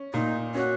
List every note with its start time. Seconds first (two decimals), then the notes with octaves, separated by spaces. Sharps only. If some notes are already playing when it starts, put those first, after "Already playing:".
Already playing: C#4
0.13 A#2 D#4
0.55 C#4 F#4